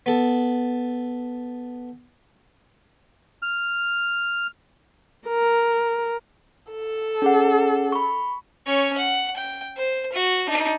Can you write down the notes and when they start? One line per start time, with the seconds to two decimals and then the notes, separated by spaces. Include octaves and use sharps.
0.06 B3 A4
3.42 F6
5.28 A#4
6.71 A4
7.22 C#4 G#4 F#5
7.92 B5 C#6
8.66 C#4 C#5
8.98 F#5
9.37 G5
9.77 C5
10.13 F#4
10.47 D4 D#4